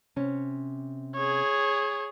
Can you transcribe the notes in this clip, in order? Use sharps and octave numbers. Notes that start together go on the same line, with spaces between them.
C3 C#4
G#4 C#5